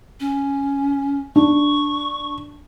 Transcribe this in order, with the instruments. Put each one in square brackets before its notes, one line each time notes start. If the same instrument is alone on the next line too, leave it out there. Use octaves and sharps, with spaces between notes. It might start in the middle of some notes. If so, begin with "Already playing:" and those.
[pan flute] C#4
[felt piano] D4 [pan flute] C#6